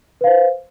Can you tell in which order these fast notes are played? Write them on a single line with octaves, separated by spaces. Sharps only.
B4 F5 C5